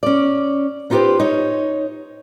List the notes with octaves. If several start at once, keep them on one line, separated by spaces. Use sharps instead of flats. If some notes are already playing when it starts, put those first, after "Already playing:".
C#4 D5
B3 D#4 F4 G4 B4 C5
D#4 C#5